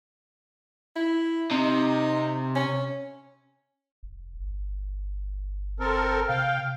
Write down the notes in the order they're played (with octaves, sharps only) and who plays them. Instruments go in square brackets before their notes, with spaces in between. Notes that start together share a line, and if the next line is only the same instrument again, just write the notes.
[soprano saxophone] E4
[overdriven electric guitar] C3 [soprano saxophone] D#4
[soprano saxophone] C#4
[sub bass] F1
G1
[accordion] C4 A4 A#4
[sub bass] C3 [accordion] F5 G5